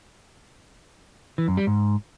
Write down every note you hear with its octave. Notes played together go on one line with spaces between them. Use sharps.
E3
F#2
G3
G#2